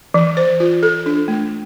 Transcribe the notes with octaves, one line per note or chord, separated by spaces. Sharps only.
E3
C5
F4
A4
D4
A3